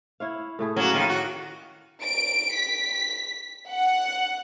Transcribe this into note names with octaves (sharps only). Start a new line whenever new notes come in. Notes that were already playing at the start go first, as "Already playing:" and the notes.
E4 C#5 F5
A2 A3 G#4
F#3 A#3 C#4 F#4
A2 D#3 F3 D5 F5 F#5
F#4
D7
B6
F#5